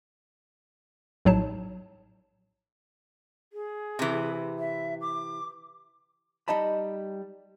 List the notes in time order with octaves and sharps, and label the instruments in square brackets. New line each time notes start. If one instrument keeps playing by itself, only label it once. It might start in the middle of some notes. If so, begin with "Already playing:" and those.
[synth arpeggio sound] A#1 A2 F#3 D#4 A5
[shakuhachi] G#4
[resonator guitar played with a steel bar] C3 E3
[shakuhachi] E5
D6
[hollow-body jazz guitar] G3 D#4 D#5 A5 B5